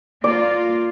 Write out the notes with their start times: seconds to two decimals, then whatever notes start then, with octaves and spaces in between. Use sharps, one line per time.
0.24 A#3 F4 D5